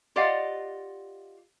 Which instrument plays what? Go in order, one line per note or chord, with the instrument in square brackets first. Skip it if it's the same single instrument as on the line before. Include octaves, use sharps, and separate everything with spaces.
[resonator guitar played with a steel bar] F4 G4 D5 D#5 F5 F#5